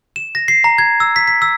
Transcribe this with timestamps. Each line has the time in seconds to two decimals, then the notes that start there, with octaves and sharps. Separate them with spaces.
0.16 E7
0.35 A#6
0.48 C7
0.64 A#5
0.78 G#6
1.00 E6
1.16 B6
1.28 B6
1.42 E6